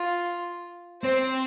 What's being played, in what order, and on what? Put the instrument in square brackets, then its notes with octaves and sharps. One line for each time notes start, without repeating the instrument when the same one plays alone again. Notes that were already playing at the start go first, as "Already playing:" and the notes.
Already playing: [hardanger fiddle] F4
[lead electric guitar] C4 [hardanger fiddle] C5